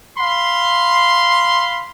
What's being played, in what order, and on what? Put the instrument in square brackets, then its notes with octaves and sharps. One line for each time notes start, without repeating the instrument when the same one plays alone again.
[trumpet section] F5 B5 C6